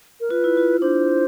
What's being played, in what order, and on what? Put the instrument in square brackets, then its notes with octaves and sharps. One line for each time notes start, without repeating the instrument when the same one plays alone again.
[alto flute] A#4
[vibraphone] F4 [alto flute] B4
[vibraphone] E4
F4
[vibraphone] D4 [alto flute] C5